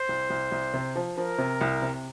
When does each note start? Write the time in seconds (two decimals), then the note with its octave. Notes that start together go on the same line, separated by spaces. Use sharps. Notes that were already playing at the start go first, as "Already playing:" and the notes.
Already playing: C5
0.09 C2
0.30 C2
0.52 C2
0.74 C3
0.96 F3
1.17 F3 A#4
1.38 C3
1.61 C2
1.82 C3